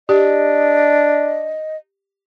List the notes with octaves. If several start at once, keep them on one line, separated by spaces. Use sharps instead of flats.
D4 G4 D#5